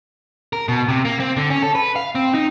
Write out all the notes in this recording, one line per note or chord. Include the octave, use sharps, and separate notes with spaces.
A#4
B2
C3
A#3
C4
D3
C#4
A4
B4
F5
C4
D#4